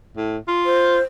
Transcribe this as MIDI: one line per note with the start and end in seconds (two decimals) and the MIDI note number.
0.17 0.37 45
0.48 0.98 65
0.66 1.02 72